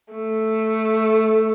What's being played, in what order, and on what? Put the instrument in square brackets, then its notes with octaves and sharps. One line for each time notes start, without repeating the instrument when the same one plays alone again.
[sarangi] A3